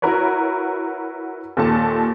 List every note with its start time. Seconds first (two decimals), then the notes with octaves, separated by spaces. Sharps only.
0.02 E4 F#4 A#4 B4 C#5
1.57 D#2 A#2 F4 A4 A5